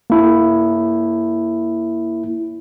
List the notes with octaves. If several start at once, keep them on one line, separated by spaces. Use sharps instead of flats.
A#3 E4